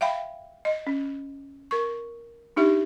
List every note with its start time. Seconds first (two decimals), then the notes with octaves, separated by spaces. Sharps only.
0.01 E5 F5 G5 B5
0.65 D#5
0.87 C#4
1.71 A#4 C#6
2.56 D4 D#4 G4 E5